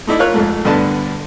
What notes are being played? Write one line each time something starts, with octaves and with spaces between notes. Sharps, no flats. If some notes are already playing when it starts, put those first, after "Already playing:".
A3 D#4 E4 D5
F4 A#4 C#5 F#6
F2 G#2 A3
G2 D3 B3 D4 A5